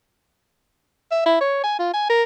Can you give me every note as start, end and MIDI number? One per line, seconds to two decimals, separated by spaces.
1.11 1.25 76
1.26 1.37 64
1.41 1.63 73
1.64 1.75 80
1.79 1.93 65
1.94 2.09 80
2.10 2.23 70